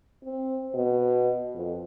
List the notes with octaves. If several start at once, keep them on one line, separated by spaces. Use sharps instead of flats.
C4
B2
F2